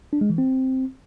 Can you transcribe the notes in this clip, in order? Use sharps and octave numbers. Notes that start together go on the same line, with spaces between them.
D4
G#3
E3
C4